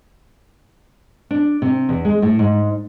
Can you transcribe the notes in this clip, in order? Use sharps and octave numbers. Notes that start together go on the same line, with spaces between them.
D4
C3
E2
G#3
A2
G#2